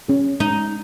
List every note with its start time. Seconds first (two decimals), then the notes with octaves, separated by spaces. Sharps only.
0.08 C#4 G#4
0.40 G#3 D#4